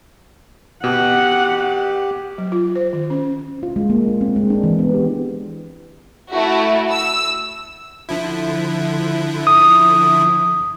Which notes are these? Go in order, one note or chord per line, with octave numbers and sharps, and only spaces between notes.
B2 G4 F#5
F#3
F4
C5
D#3
C#4
F4
G#3
A#3
D4
C4
G#3
D4
E3
B3
G4
A3 E4 F#4
E6
D3 F3 E4
D#6